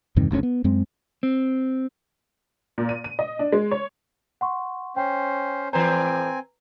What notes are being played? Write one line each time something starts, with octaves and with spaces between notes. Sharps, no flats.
E2 G2 C3 D#3
F#1 D2 A2 C#4
B3
F#2 G#3 C4
C4
A#2
D#7
D#7
D#5
D4
G#3
C#5
F#5 C6 C#6
C#4 C5 G5
A2 E3 C4 B4 C5 G#5 A#5